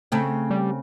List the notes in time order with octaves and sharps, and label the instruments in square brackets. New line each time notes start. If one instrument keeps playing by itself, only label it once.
[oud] C#3 A3 C4
[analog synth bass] G3